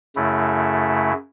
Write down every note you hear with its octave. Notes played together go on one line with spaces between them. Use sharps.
F#2 C#3 A3 E4